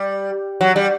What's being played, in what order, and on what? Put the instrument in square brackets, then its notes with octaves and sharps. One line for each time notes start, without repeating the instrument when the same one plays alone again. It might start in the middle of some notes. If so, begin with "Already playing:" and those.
Already playing: [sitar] G3
F#3
G3